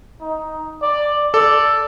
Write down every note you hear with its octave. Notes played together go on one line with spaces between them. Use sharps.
D#4
D5
A4 D5